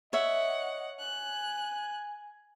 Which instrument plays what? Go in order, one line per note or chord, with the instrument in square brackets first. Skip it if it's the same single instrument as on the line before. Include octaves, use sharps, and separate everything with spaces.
[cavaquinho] C#5 E5 [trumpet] D#5 [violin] F#5
[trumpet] G#5 [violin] F#6